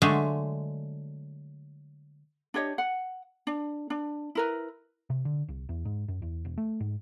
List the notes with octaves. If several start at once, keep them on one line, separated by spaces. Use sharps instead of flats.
D3 F#3 G#3 A3
D4 G4 C#5 D#5
F#5
D4
D4
E4 A#4 B4
C3
D3
C2
E2
G#2
F#2
E2
E1
A3
G#2